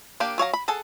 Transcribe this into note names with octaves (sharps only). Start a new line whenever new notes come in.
A#3 D4 G4 F5
F#3 C#5 F5 A#5
B5
G#4 A4 F#5 A5